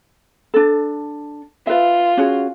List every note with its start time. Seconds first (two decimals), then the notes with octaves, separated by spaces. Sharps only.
0.54 D4 A4
1.67 F4 B4 E5
2.17 C#4 F#4 G#4